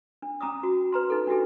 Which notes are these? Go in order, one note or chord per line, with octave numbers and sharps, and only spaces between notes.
D4
C#4 A#5 D6 D#6
F#4
B4 A#5 C6
D#4 A4
D4 F#4 G4 A4